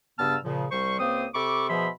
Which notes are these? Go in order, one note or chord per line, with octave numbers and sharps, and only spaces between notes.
G2 C#3 B3 A5 E6 F6
A#2 C#3 F3
C2 G3 C5 C#6
C#2 A#3 C4 C5 D#6
C3 A4 B5 C#6 D6
B2 F3 G#4 E5 B5 C6